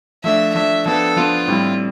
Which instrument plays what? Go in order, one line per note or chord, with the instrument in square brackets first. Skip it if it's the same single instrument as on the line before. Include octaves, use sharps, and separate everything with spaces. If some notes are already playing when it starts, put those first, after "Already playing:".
[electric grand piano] F3 A3 D4 [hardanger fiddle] E5
[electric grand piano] F3 A3 D4 [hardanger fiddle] E5
[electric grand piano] F3 B3 D4 [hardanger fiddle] A4
[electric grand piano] F3 B3 D4 [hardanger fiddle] F4
[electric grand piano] A2 G3 C4 E4